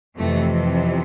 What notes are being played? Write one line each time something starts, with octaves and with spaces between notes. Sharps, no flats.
F2 C3 E3 A3